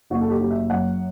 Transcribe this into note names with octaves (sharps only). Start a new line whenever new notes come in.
F#1 F#4
A4
G4
F#3
E5
F#2 F#5